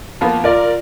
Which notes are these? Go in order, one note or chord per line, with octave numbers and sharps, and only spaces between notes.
F3 A#3 B3
F4 A#4 D5